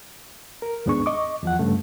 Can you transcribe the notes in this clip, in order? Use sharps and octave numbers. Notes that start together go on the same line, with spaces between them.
A#4
D#2 G#2 B3 D4 G#4 C#6
D#5 C#6 D6
E2 F3 F#5
G2 C#3 A3